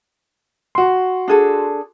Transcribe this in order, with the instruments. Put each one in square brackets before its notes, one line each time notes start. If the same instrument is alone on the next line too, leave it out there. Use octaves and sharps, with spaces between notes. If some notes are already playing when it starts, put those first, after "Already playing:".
[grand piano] F#4 C6
[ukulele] D4 G#4 A4